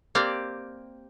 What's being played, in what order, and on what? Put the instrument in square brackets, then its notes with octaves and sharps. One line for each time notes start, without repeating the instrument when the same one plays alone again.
[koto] A#3 C4 G4 D5